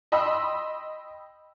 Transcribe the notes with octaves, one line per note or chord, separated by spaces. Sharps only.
D#5 G5 B5 C6 E6